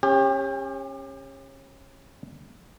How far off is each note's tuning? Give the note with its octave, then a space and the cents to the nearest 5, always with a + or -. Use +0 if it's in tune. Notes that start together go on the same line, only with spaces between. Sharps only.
C#4 -25 G4 +30